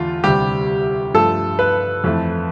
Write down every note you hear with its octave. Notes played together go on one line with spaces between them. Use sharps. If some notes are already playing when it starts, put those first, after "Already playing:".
Already playing: E2 D3 A3 F4
D2 C3 G3 G4
G2 F3 A3 A4
B4
F2 E3 A3